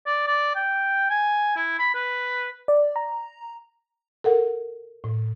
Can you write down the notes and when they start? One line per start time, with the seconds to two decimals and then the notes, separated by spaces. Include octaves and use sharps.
0.07 D5
0.27 D5
0.55 G5
1.10 G#5
1.56 E4
1.79 B5
1.95 B4
2.68 D5
2.96 A#5
4.24 A4 A#4 F#5
5.04 A2